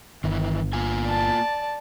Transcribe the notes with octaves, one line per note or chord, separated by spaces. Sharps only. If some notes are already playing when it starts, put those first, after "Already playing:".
G1 D#3 E3
A#3 F4 G#5
D5 A5